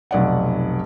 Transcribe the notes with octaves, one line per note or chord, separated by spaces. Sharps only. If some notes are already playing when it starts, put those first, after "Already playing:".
F1 B1 D5 F#5